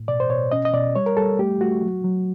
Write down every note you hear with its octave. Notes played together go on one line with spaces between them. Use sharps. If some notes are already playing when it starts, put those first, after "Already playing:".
Already playing: A2
B2 D5
C5
B2 C#5
C#4 D#5
D#5
B2 D5
G3 C#5
A#4
G3 A4
A3 G4
A3 F#4
F#3
F#3